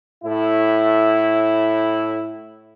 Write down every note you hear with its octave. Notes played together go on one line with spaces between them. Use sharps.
A2 E4